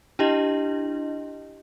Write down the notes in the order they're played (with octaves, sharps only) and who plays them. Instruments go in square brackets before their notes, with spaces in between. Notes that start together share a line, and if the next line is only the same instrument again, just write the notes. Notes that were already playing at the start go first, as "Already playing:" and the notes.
[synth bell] D4 E4 G4 D#5